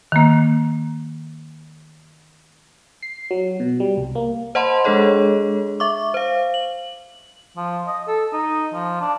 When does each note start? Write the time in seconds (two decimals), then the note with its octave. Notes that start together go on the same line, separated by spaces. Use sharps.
0.12 D#3 A#3
3.03 C7
3.31 F#3
3.60 B2
3.80 G3
3.97 C2
4.15 A#3
4.55 C5 D#5 F#5 A5 B5 C6
4.84 G#3 D4 G#4 A4 C#5 D#5
5.80 E5 C#6 D6
6.14 C5 F5
6.54 F#7
7.57 F3
7.87 D#5
8.08 A4
8.33 D#4
8.74 F3
9.01 D4